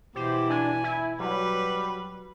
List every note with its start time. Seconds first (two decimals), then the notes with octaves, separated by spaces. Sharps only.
0.16 B2 E3 E4 G4 C5
0.50 D4 G#5
0.84 E4
1.20 F#3 G3 B4